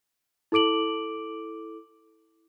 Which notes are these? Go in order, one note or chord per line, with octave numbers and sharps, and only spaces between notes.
E4 A4 D6 D7 F#7